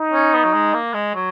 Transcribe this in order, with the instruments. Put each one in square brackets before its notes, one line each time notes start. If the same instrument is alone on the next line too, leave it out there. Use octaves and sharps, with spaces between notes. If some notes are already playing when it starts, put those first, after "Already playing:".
Already playing: [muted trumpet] D#4
[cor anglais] C#4
B3
F#3
G#3
A#3
G#3
F#3